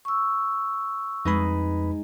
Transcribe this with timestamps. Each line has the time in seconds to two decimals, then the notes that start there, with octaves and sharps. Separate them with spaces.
0.05 C#6 E6
1.25 F2 G#3 D#4 B4 B5